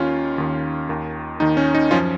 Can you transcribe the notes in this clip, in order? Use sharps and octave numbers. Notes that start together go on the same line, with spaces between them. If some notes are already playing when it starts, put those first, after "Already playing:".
Already playing: D#2 D#3 C#4 F4
D#2 D#3
D#2 D#3
D#2 D#3 D#4
C#4
D#4
F#2 F3 C#4 F4